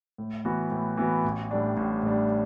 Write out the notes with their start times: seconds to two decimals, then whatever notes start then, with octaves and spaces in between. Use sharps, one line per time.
0.18 A2
0.45 E3 B3 F#4
0.71 A2
0.97 E3 B3 F#4
1.24 A1
1.51 A2 G3 D4
1.77 A1
2.03 A2 G3 D4